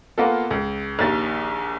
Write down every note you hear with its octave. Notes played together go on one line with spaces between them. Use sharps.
A#3 B3 F4 A4
C#2
A#1 D#2 A6